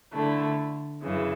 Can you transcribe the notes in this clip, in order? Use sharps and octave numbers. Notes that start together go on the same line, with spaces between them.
D3 A3 E4
F#2 C#3 E3